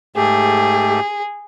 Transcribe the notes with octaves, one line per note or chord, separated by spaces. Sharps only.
G#2 A3 G4 G#4